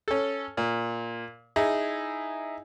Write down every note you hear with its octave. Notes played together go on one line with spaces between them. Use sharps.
C#4 A4
A#2
D#4 E4 G#4